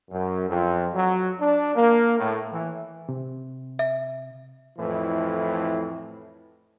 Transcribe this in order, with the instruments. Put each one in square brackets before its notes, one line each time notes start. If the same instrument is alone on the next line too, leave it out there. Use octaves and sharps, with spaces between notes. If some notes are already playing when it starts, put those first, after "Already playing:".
[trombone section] F#2
F2
F#3
D4
A#3
A2
E3
[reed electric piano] C3
[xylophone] E5
[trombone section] F2 A2 E3